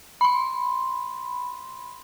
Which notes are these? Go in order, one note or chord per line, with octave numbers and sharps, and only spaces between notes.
B5 C6